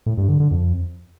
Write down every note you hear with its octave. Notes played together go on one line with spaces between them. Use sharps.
A2
G2
D3
D3
F2